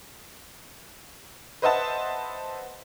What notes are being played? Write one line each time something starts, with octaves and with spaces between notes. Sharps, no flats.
B4 C5 D#5 E5 F#5 A5